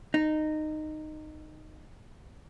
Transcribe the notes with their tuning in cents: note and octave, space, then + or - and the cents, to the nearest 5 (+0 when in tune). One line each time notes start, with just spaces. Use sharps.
D#4 -15